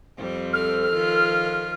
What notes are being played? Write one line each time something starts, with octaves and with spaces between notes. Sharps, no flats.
F2 G3 C4
A4 F6
D#3 F3 F4